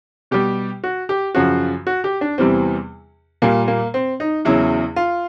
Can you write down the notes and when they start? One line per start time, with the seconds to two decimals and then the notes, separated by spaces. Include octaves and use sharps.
0.31 B2 G3 G4
0.84 F#4
1.09 G4
1.35 F#2 C#3 F3 F#4
1.87 F#4
2.04 G4
2.21 D4
2.38 E2 C3 E3 G3 C4
3.42 A#2 G3 A#3
3.68 A#3
3.94 C4
4.20 D#4
4.45 E2 C#3 F#3 E4
4.96 F4